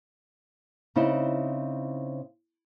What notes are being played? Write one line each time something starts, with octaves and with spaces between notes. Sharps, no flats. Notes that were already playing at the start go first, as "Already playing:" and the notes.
C#3 C4 D#4 E4 C5